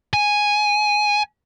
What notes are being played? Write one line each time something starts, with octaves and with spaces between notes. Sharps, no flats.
G#5